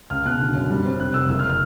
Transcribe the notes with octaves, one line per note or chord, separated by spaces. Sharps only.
C#2 F6
B2 F#6
D3
F#2
G3
C4
F1 F#6
F1 E6
F#1 E6
F6
F6